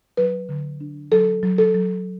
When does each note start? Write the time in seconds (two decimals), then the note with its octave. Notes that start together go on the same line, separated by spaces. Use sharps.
0.17 F#3 B4
0.49 D3
0.81 D4
1.12 F#3 A4
1.43 F#3
1.58 A4
1.75 F#3